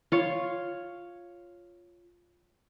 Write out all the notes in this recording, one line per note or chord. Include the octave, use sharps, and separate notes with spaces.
F4 C#5